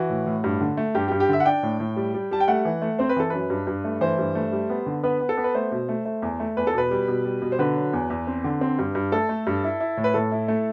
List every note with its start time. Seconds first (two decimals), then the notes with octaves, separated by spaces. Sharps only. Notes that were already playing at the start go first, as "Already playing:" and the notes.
Already playing: E3 F#4
0.10 A2
0.26 A2
0.44 G2
0.61 D3
0.77 A3
0.95 G2 G4
1.08 G4
1.12 G2
1.20 G4
1.29 D3 E5
1.40 F#5
1.45 D4 G5
1.63 A2
1.80 A2
1.97 G3
2.14 G3
2.31 G3 A5
2.40 G5
2.48 A3 F#5
2.65 E3
2.82 A3
2.99 C4 C5
3.09 B4
3.16 E3 A4
3.30 F#2 B4
3.50 G2
3.67 G2
3.84 A3
4.01 E3 C5
4.18 G2
4.35 A3
4.52 G3
4.70 B3
4.86 D3
5.03 B3 B4
5.20 B3
5.29 A4
5.37 B3
5.44 B4
5.54 A3 C5
5.72 B2
5.89 A3
6.05 A3
6.22 E2
6.40 A3
6.57 E2 B4
6.67 A4
6.74 B2 B4
6.91 G3
7.08 B2
7.25 G3
7.42 B2
7.52 C5
7.59 D3 B4
7.76 F#3
7.93 E2
8.10 E2
8.27 C4
8.44 D3
8.61 C4
8.79 G2
8.95 G2
9.12 A3 A4
9.29 A3
9.47 G2
9.64 E4
9.80 E4
9.97 A2
10.04 B4
10.14 A2 A4
10.32 E4
10.48 A3